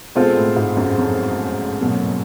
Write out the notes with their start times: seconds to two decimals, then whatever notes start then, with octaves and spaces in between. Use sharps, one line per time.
0.15 B2 G#3 C4 F4 A4 C5
0.37 A2
0.56 G#2
0.77 F#2
0.98 F2
1.81 B2 F#3 A#3